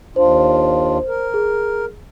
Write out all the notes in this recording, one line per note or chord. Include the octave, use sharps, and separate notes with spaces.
D#2 D4 F4 C5
A#4
G#4